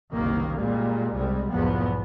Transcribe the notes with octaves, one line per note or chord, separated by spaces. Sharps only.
F#1 C2 D#3 A#3
A#2 G3 G#3
C2 G3 G#3
B1 E2 G#2 F3 B3